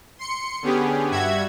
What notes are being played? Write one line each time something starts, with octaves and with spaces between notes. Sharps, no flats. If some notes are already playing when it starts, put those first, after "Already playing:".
C6 C#7
D3 B3 C#4 G4 G#4
G2 G3 F#4 E5 G#6